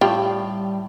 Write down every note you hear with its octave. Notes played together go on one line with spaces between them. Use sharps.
A2 G3 F4 G4